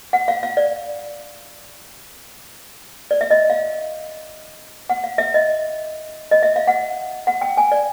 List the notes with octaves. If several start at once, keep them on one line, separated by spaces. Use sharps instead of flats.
F#5
F5
F5
D5
D5
E5
D#5
F5
F#5
F5
E5
D#5
D#5
E5
F5
F#5
F#5
G5
G#5
D5